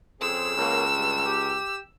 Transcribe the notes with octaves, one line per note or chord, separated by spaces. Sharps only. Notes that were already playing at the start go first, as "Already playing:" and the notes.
F2 C#3 C4 G#4 E6
C#2 B2 F#3 A#3
G2
G4